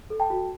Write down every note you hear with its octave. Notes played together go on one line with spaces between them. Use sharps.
A4
G5 A5
F#4